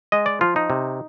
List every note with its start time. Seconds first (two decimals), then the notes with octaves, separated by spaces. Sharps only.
0.12 G#3 D#5
0.26 D5
0.41 F3 F4
0.56 D#4
0.70 C3